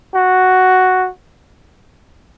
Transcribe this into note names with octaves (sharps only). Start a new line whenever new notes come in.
F#4